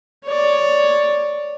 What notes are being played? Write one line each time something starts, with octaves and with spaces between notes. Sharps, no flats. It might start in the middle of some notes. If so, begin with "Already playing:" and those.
C#5 D5